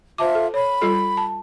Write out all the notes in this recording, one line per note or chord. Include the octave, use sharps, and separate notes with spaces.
F4 C5 E5 A5 D6
A4
C#5 B5
G3 F4 A4
A5